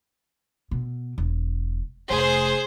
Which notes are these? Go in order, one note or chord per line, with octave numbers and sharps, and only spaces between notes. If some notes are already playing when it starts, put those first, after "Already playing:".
B2
E1
F1 G#4 C5